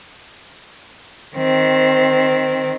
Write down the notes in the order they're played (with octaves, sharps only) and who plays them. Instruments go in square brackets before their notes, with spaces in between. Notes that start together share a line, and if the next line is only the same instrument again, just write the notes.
[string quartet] D#3 C4